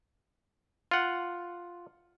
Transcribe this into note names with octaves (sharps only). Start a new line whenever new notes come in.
F4 F#5